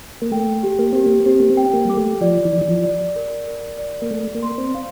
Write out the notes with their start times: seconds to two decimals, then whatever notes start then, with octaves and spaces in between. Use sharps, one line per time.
0.22 A#3
0.31 A3 G5
0.63 G4
0.79 A#3
0.93 C4 G4
1.06 A#3
1.26 C4 G4
1.40 A#3
1.50 C4
1.57 G5
1.73 A#3
1.85 G3 D6
1.97 A3
2.21 F3 D5
2.45 E3
2.53 D5
2.61 E3
2.68 F3
2.84 D5
3.16 A#4
3.47 A#4
3.78 D5
4.02 A#3
4.11 A3 D5
4.35 A#3
4.43 C6
4.58 C4
4.74 F5